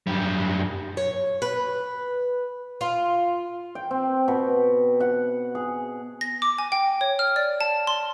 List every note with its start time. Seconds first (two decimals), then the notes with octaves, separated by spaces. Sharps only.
0.07 F#2 G3
0.97 C#5
1.42 B4
2.81 F4
3.75 G5
3.91 C4
4.28 B2
5.00 F#5
5.55 G#4
6.21 A#6
6.42 D6
6.58 G#5
6.72 G5
7.01 C#5
7.19 F6
7.36 D5
7.61 A5
7.87 C6